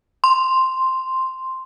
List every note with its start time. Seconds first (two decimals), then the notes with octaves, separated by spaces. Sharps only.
0.24 C6